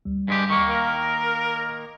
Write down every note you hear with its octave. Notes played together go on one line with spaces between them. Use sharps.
D2 G3
G2 G#3 G4
D#3 A#3 C#6
A#4 F5 F6